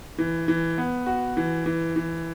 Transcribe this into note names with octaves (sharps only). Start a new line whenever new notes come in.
E3
E3
B3
F#4
E3
E3
E3